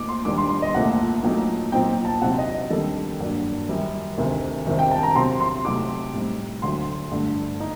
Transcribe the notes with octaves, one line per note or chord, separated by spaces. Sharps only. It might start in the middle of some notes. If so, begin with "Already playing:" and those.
Already playing: A#2 A3 D#4 D6
C6
D#2 D#3 G3 D4 D6
C6
C6
D#5
C2 A#2 A3 F#5
A#2 F#3 A3 D#4
A#2 F#3 C4 D#4 G5
A5
C3 F#3 C4 D#4 F#5
D#5
D#5
D#2 D#3 G3 D4 A4
G2 F#3 A#3 D4
F#2 D#3 G3
D2 C3 D#3 A3
C2 C3 D#3
G5
A5
A#5
C3 F#3 C4 C6
C6
C3 F#3 A3 D#4 D6
A2 G3 C4 D#4
D2 D3 F#3 C6
G2 D3 A3
D#4